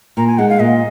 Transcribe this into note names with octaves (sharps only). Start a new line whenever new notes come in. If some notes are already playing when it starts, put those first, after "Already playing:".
A#2 A#5
G#5
G#3 D#4 F#5
F5
A#2 D#5